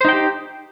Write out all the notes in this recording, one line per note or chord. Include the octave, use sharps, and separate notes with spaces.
D#4 G4 C5 G5